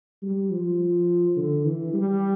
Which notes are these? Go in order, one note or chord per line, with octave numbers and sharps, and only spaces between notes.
G3
F3
D3
E3
G3